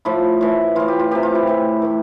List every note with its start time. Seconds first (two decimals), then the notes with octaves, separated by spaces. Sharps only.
0.05 A2 F3 E4
0.41 A2 E3
0.76 A2 E3 F4
0.88 G4
0.99 F4
1.11 C3 E3 G4
1.23 F4
1.35 E4
1.47 A2 E3
1.82 A2 E3